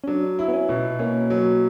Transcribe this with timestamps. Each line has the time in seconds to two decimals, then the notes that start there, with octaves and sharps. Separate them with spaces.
0.04 C#4
0.07 F#3 D4
0.39 E4
0.48 B3
0.54 C#4
0.69 B2
0.99 A#3 C#4
1.30 F#3